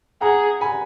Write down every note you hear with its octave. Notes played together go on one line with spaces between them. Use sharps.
G#4 F#5 A#5
G#5 B5